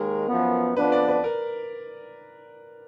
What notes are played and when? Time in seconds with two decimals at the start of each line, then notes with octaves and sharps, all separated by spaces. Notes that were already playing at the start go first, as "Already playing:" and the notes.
Already playing: D#2 D#3 G#3 A#4
0.29 F#2 F3 B3
0.77 F2 F3 B3 D4 B4
0.92 D5
1.09 B4
1.24 A#4